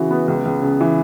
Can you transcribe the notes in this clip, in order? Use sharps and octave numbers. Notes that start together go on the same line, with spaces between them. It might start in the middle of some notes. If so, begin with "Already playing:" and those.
Already playing: C#3 E3 F#4
B3
C#2
C#2
C#3
E3